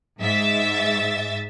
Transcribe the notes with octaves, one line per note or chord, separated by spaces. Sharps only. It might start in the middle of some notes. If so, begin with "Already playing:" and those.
G#2 E5 A6